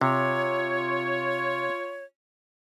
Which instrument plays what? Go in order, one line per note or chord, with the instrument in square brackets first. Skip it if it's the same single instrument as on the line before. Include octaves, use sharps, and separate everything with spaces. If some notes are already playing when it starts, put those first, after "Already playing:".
[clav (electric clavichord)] C3 [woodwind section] F4 C#5